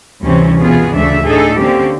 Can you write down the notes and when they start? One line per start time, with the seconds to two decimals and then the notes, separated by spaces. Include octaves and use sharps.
0.22 D2 G2 C3 E3 C4 C#4
0.60 B2 E3 B3 F4 G#4
0.95 D2 C#3 A3 D4 E5
1.27 A2 D4 D#4 G#4 A4
1.57 D3 A#3 C4 C#4 G4